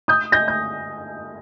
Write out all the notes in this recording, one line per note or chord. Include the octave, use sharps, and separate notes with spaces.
D#6 G6
G6 A#6
G6